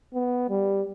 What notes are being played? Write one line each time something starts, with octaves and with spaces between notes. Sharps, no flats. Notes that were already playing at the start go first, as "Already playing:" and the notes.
B3
G3